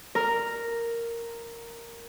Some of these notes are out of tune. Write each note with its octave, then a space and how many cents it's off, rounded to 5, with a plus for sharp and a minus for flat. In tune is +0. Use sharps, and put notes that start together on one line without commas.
A#4 -5